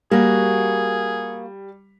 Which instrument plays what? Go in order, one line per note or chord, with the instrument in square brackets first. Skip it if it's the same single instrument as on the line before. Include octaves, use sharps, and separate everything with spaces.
[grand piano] G3 [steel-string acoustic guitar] A#3 F#4 [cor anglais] G#4